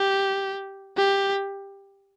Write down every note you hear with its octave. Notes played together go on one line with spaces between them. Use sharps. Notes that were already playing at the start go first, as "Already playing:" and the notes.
Already playing: G4
G4